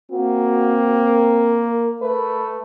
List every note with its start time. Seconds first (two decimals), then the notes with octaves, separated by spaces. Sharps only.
0.11 A#3 C4 F#4
1.05 A#4
2.02 A3 B4